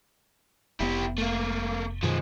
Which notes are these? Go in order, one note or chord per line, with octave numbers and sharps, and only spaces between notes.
F1 B3 E4 G4
A3 A#3
F#2 B2 D#3 F3 G#3